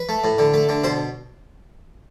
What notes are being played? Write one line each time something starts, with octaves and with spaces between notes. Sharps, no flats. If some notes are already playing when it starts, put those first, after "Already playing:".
Already playing: B4
A3
A2
D3
A3
D3
B2 C5